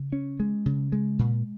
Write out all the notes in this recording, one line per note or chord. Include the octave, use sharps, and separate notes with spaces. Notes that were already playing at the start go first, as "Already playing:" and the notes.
Already playing: C#3
C#4
G#3
C#3
G#3
A#2